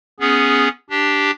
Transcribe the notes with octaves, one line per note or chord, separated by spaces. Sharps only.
B3 C#4 G#4
D4 G4